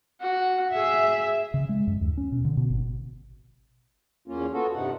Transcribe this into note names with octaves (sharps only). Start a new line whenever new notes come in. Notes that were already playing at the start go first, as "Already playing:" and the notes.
F#4 F#5
G#4 E5
C#3
G#3
F#2
D#2
C#4
B2
D3
B2
G#1
E2 A#3 C#4 F4
B3 F4 F#4 A4
G2 C3 D#4 F#5